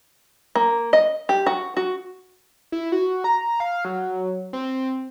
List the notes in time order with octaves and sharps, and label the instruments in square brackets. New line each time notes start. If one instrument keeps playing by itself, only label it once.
[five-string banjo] A#3
D#5
G4
F#4
F#4
[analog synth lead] E4
F#4
A#5
F5
F#3
C4